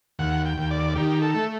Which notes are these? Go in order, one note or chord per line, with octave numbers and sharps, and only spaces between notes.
D#2 F#5
G5
D#2
D5
D#3 G4
A4
A3